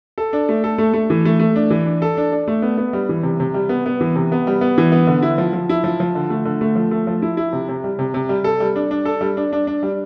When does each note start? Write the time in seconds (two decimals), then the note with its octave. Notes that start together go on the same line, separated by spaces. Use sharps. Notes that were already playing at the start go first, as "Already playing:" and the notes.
0.18 A4
0.33 D4
0.49 A3
0.64 A4
0.78 A3
0.94 A3
1.10 E3
1.25 A3
1.39 A3
1.56 D4
1.70 E3
1.85 D4
2.02 A4
2.17 D4
2.32 D4
2.48 A3
2.62 B3
2.77 B3
2.93 G3
3.09 E3
3.23 C3
3.40 C3
3.54 G3
3.69 B3
3.86 B3
4.01 E3
4.16 C3
4.32 B3
4.47 G3
4.61 B3
4.78 E3
4.92 B3
5.07 D3
5.22 E4
5.38 F3
5.53 F3
5.69 E4
5.84 F3
6.00 F3
6.15 D3
6.30 A3
6.45 D3
6.61 A3
6.76 F3
6.91 A3
7.07 F3
7.22 E4
7.37 E4
7.53 C3
7.69 C3
7.84 G3
7.99 C3
8.14 C3
8.29 G3
8.44 A4
8.60 G3
8.76 D4
8.91 D4
9.05 A4
9.21 G3
9.37 D4
9.52 D4
9.67 D4
9.83 G3